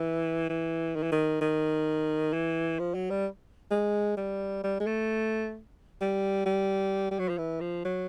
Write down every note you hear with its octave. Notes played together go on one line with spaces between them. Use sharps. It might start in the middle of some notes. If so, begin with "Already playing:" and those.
Already playing: E3
E3
D#3
E3
D#3
D#3
E3
F3
F#3
G3
G#3
G3
G3
G#3
A3
G3
G3
G3
F#3
F3
E3
F3
F#3